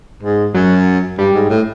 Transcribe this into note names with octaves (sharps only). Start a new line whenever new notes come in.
G#2
F#2 F#3
G2 G3
G#2
A2